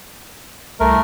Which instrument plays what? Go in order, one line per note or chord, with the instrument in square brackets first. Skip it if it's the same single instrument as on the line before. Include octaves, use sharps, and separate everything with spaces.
[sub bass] C2 [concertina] A3 A#4